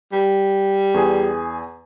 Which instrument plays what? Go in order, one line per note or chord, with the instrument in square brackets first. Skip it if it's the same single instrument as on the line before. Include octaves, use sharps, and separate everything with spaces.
[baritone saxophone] G3
[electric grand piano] E2 G#4 G#5